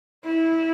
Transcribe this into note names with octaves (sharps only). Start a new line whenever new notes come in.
E4